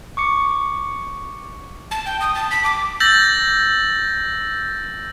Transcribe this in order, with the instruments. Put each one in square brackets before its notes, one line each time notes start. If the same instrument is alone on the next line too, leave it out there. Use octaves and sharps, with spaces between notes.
[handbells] C#6 D6 C#7
[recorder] A5
G5
D#6
A5
B6
D6
[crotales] E6 G6 A6 A#6 F#7